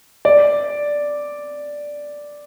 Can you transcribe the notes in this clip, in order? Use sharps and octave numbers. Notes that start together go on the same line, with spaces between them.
D5